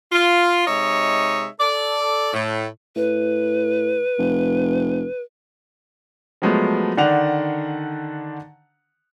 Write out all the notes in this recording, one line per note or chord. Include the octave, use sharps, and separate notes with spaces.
F4
C3 G#3 D#4 C#5 E5
A4 D5
A2
A2 B4
F1
F3 F#3 G#3 A3 B3
D3 D#3 D4 F#5 F7